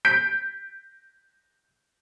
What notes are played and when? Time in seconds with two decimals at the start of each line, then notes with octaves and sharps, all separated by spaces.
0.05 G6 B6 D7